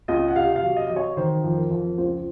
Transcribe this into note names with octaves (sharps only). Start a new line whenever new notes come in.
C#2 D#5
F#5
C3 F5
F5
F#3
D#5
F#3 D#5
C#5
D#3 C5
F2
A#4
F2
C#2 C5